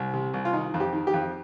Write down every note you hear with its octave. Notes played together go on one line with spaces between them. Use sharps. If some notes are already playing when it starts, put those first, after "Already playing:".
Already playing: C2
C3
C2
F4
D#3 D#4
F2
G4
D#3
G4
F2